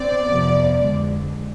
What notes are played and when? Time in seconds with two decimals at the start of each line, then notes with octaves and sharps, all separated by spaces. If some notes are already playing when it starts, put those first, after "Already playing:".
Already playing: C4 D5
0.26 F2 C3 F3 B3
0.81 F2 D3 G#3